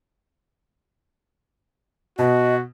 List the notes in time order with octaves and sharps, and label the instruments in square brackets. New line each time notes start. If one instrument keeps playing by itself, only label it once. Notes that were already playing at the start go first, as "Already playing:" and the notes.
[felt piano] B2 [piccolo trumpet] F#4 [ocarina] D#5